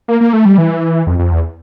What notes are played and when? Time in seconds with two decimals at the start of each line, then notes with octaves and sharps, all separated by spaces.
0.08 A#3
0.21 A#3
0.33 A3
0.45 G3
0.58 E3
1.07 F2
1.19 F2
1.31 E2